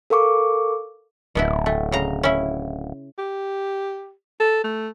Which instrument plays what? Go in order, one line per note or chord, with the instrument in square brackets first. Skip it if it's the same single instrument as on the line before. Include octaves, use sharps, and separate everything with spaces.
[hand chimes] A4 A#4 F5 C#6 D6
[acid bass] D1 [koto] B2 B3 E4
[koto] A3
C#3 A#5
C#4 E4
[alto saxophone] G4
A4
A3